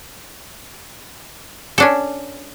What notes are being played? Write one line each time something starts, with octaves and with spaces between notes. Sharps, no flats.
C#4 D4 A4